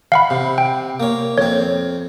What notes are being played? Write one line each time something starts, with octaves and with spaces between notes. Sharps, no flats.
F5 F#5 B5
C3
G5
A#3 C#5
F2 C4 C#5